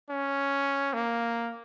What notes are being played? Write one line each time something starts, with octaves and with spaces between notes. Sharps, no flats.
C#4
A#3